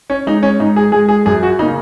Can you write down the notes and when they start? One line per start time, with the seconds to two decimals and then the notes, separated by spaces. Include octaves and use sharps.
0.10 C#4
0.27 G#3 D#4
0.43 C#4
0.60 G#2 D#4
0.76 G#4
0.92 G#3 G#4
1.09 G#4
1.26 F#2 G#4
1.43 F#4
1.59 C#3 D#4
1.62 A#3